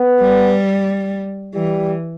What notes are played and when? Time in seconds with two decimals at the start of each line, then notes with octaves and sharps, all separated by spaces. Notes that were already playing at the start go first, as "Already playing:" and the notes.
Already playing: B3
0.21 G3
1.54 E3 G3